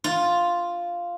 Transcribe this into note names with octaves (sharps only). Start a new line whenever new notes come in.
F4